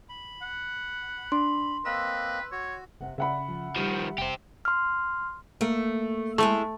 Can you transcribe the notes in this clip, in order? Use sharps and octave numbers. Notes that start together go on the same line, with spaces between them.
B5
F#5
D4 C6
A#3 C4 B4 D#5 E6
F#4 C#5
F1 C3 F#5
C#3 C#4 D5 E5 F#5 B5
F3
D#3 F3 G3
F1 G4 C5
C6 F6
A3 A#3
G#3 A3 E4 E5